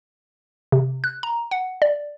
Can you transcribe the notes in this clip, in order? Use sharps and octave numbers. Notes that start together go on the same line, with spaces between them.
C3
F#6
A#5
F#5
D5